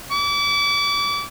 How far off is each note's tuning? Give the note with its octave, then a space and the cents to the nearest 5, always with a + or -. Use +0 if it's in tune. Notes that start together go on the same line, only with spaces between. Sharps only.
D6 -35